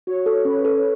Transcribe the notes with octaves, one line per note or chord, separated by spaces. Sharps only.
F#4 C#5
A4
C#4 B4
A4